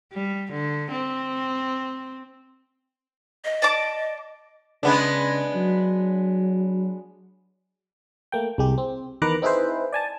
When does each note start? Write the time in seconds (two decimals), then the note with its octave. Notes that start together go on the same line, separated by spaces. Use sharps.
0.13 G3
0.53 D3
0.91 C4
3.45 D#5
3.62 D5 A5 D6
4.83 C#3 G#3 B3 D4
5.55 F#3
8.32 A3 A#3 G5
8.58 C2 G#3 G4
8.78 C4
9.22 E2 D#3 B4 A#5 D6 F#6
9.42 C4 D#4 E4 G#4 B4 C5
9.93 D5 G#5 A5